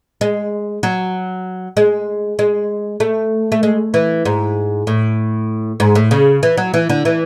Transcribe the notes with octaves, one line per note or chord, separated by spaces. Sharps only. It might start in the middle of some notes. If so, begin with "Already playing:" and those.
G#3
F#3
G#3
G#3
A3
A3
G#3
E3
G#2
A2
G#2
A2
C#3
E3
F#3
E3
D3
E3